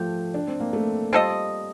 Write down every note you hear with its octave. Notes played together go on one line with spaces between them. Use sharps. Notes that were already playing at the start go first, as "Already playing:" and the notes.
Already playing: F3 A3 G4
D4
C4
A#3
A3
G3 C4 F4 A4 D#5